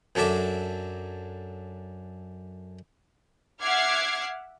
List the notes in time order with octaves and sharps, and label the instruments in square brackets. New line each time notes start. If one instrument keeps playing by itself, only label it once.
[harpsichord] F#2 F#3 D4 A4 E5 D6
[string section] E5 F#5 D6 F6 G#6 C7